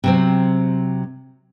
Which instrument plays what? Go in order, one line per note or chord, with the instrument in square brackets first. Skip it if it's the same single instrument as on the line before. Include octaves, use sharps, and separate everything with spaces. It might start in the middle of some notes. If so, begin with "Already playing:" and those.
[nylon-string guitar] C3 F#3 C4